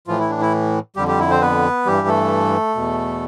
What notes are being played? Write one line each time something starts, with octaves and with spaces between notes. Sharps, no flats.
A2 E3 F3 F4
E4
D4
E4
F2 D3 G3 G4
G3 G4
E4
C4 C5
B3 B4
G2 E3 G3 G4
A3 A4
E2 B2